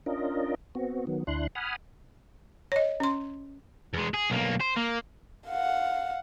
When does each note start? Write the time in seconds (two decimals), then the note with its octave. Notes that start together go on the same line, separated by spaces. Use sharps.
0.06 C#4 D4 F4 A#4 D#5
0.75 B3 C4 F#4
1.07 D#3 F#3 B3
1.27 D2 D4 E4 C6 F#6
1.55 F#5 G#5 B5 D#6 F6
2.72 C#5 D#5
3.00 C#4 C6
3.94 E2 G#3
4.14 G#4
4.30 B1 A#3
4.60 C5
4.76 A#3
5.47 F5 F#5